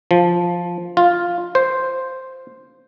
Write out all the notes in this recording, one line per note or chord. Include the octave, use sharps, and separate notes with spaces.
F3
F4
C5